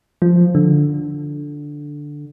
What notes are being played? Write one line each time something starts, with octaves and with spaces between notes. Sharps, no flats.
F3
D3